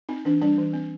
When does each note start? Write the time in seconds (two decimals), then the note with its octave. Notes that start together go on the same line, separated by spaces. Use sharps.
0.09 C4 D#4
0.25 E3 D4
0.42 G3 D4
0.58 E3
0.74 C4